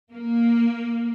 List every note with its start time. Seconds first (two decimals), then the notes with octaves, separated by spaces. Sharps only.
0.13 A#3